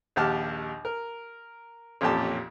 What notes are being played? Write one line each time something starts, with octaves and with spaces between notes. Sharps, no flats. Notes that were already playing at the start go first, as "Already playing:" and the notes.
A#1 D#2 G4 F#5 A5 F6
A#4
A1 F2 A#2 C#4 G4 A5